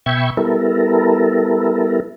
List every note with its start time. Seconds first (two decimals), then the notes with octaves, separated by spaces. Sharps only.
0.06 B2 E5 G5 B5 C#6 G#6
0.37 G3 B3 E4 A4 A#4